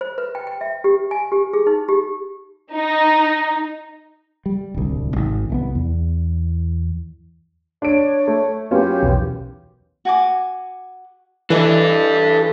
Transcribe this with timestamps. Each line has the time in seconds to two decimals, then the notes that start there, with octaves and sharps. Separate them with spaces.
0.01 C5
0.18 B4
0.35 G5
0.47 G5
0.61 E5
0.84 G4
1.11 G#5
1.32 G4
1.53 G#4
1.67 D#4
1.88 G4
2.72 D#4
4.46 G3
4.74 D1 C2
5.16 G#1
5.50 C2 A3 B3
5.75 E2
7.82 D4 C#5 D7
8.27 A3
8.71 F#2 B3 C#4 F4 G4
9.03 B1 E2
10.05 F#4 G#5 D6
11.50 E3 D4 G4 A4 D#5 A5